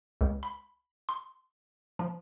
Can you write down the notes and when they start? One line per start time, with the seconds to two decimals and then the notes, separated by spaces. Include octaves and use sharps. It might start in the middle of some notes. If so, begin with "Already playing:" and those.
0.21 C#2
0.43 B5
1.09 C6
1.99 F3